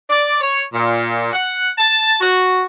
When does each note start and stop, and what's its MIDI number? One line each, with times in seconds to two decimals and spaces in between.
0.10 0.40 74
0.41 0.63 73
0.74 1.32 46
1.33 1.69 78
1.79 2.17 81
2.21 2.63 66